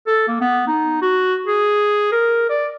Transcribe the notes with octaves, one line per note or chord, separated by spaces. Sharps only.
A4
A#3
B3
D#4
F#4
G#4
A#4
D5